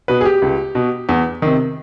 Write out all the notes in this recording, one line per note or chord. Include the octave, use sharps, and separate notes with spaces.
B2 B4
G#4
G4
C#2
B2
E2
C3 D#3